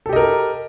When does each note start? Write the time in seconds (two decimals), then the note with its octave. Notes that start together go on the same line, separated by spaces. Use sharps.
0.06 A4
0.09 G4
0.13 D#5
0.16 A#4